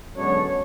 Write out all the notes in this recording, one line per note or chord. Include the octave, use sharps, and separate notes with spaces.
F#2 D3 G#3 B3 D4 C#5